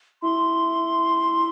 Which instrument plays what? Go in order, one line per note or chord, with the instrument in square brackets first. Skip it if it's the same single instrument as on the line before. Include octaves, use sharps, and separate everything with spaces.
[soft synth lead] E4 [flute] C6